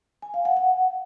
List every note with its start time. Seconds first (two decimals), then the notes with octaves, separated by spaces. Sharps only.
0.22 G#5
0.34 F5
0.45 F#5
0.57 F#5